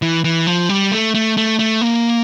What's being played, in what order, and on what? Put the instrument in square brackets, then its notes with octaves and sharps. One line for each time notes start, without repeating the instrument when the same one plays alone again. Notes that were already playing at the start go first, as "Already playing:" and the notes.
[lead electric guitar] E3
E3
F3
G3
A3
A3
A3
A3
A#3